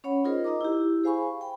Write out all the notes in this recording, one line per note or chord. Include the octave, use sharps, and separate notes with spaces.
C#4 C#5 F#5 B5
D#4 F4 G#4 A#4 C5 D#5
D#4 D#5 A#5 D6
E4 G4
G#4 C5 F5 G#5 B5 C#6
G5 B5